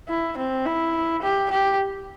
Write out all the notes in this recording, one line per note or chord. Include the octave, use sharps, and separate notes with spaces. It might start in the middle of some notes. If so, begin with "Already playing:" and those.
E4
C4
E4
G4
G4